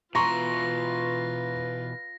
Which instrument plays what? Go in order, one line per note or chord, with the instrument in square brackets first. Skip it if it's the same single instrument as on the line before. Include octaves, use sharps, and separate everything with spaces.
[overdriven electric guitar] B2 E3 [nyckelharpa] F4 B4 [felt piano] A#5 C6 C#6 [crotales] A#6